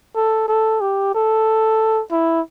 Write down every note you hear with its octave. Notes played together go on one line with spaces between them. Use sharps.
A4
A4
G4
A4
E4